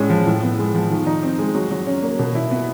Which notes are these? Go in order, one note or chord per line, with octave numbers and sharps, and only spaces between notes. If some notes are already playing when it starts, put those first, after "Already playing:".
Already playing: A2 G#3 C#4
F3
A2
B3
G#3
F3
D#3
D#4
C4
G#3
F#3
F#3
C#4
A#3
B2
E4
B3